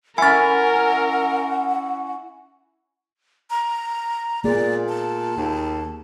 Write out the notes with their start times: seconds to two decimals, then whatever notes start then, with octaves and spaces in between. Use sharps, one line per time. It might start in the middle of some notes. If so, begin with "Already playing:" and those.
0.18 C#4 E4 A#4 F#5 G#5 A6
3.50 A#5
4.44 A#2 A#3 B3 G#4 D5
4.89 A5
5.37 D#2